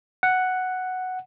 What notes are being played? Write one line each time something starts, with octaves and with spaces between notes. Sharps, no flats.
F#5